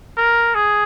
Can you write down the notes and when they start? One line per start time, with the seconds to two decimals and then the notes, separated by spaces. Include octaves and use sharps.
0.17 A#4
0.55 G#4